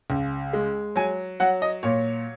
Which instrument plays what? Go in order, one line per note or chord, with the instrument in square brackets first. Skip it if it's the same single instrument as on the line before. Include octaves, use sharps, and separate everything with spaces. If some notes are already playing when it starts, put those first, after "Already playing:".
[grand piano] C#2
G#3
F#3 G#5
F#3 F#5
D#5
A#2 C#5